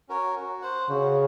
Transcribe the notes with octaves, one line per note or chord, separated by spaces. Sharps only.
C#4 F#4 A#4 C#5
F#4
C5 F#5
C#3 F#4